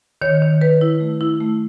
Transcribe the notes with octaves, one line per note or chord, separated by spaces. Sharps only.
D#3 C#5
D#3
D#3 B4
E4
A3
E4
A3